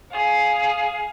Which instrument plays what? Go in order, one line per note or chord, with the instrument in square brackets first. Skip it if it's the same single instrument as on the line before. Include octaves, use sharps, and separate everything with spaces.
[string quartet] G#4 F5